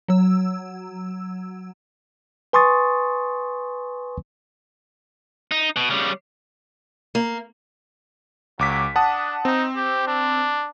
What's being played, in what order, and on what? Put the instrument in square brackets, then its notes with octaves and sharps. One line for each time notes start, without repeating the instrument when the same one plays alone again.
[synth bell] F#3 E6
[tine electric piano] B4 G#5 C6 C#6 D#6 A6
[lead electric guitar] D#4
B2
C#3 G3
[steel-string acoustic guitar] A#3
[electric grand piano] C#2 D6 B6 [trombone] F#3
[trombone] D4 [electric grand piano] F#5 A5 D#6
[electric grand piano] C4 [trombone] D#4
[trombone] G4
D4